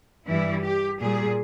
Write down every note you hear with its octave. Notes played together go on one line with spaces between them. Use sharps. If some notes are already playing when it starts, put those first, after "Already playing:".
G2 E3 G3 E4
G4
A#2 G3 G#4